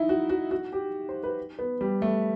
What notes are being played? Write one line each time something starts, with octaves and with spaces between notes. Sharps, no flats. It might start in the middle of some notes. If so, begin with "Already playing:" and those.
Already playing: D#4 E4
F#4
F#4
F#4
G4
C5
B4
B3
G3
A3